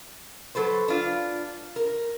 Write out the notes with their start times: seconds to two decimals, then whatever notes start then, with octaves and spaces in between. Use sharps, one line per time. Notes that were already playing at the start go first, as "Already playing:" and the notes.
0.55 F#3 A4 B4 C5
0.88 D4 F4
1.76 A#4